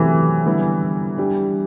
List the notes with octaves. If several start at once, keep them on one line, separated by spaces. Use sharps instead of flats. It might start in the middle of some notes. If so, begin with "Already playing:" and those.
Already playing: C3 E3 F#3 A3 E4 G4
D3 G3 B3 E4
G3 D4 G4